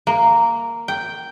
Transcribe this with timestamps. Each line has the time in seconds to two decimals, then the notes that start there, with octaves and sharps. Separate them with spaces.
0.07 A#3
0.88 G5